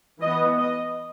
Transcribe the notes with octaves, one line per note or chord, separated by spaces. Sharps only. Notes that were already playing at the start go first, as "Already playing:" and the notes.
E3 B3 D#5
D#5